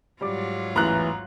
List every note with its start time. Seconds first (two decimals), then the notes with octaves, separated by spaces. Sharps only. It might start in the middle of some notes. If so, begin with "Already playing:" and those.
0.21 G#2 F#3 G3 F4 D5 D6
0.76 A1 E2 E3 A#5 F#6